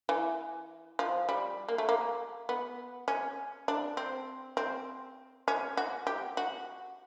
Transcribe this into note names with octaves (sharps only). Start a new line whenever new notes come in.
E3
F3
G3
A#3
A3
A#3
B3
C#4
D4
C4
C4
C#4
F#4
G4
F#4